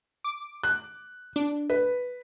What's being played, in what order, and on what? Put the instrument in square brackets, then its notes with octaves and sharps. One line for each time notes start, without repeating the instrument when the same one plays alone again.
[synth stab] D6
[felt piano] F#6
[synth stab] D4
[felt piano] B4